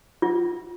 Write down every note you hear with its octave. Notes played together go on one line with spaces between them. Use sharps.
F4